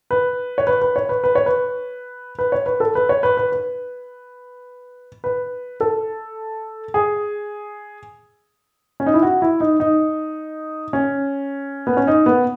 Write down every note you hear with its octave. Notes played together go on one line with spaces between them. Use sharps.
B4
C#5
B4
B4
C#5
B4
B4
C#5
B4
B4
C#5
B4
A4
B4
C#5
B4
B4
B4
B4
A4
G#4
C#4
D#4
E4
F#4
E4
D#4
D#4
C#4
B3
C#4
D#4
B3